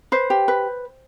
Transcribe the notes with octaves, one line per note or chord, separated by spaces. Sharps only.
B4 C5
G4
B4